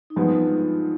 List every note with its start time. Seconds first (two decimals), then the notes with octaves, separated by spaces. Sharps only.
0.10 D#4
0.16 G2 F3 G#3 B3 F4